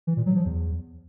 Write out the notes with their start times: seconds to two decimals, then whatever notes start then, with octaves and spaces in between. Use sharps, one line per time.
0.07 E3
0.17 A#2
0.26 F#3
0.36 F3
0.45 E2